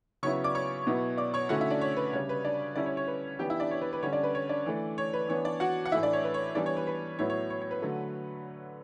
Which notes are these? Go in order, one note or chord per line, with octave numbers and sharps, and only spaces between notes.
C#3 F#3 B3 E4 C#5 C#6
D5 D6
C#5 C#6
B2 F#3 B3 E4
D5 D6
C#5 C#6
D3 A3 C#4 E4 F#4 F#5
E4 E5
D4 D5
C#5
B4
C#3 G3 D4 C#5
B4
D4 D5
D3 G3 C#4 D4 E4 D5
C#5
C#5
B4
E3 B3 D4 G4 G5
E4 E5
D4 D5
C#5
B4
B4
D3 G3 C#4 C#5
D4 D5
B4
C#5
D4 D5
E3 A3 D4
C#5
B4
E3 B3 D4 C#5
D4 D5
F#4 F#5
F#5
A2 E3 A3 E4 E5
D4 D5
C#5
B4
C#5
E3 G3 B3 D4 D5
C#5
B4
B4
A2 F#3 B3 E4 C#5
C#5
C#5
C#5
B4
D3 F#3 A3